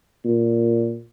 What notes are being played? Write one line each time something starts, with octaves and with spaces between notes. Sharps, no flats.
A#2